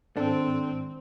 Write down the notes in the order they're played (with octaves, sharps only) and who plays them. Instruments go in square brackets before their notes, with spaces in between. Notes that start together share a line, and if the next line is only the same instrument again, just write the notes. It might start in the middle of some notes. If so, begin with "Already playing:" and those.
[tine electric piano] G#1 [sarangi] C4 [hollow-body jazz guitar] D4 A4